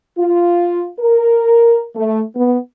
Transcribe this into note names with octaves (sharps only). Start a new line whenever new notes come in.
F4
A#4
A3
B3